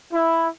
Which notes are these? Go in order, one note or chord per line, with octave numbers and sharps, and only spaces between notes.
E4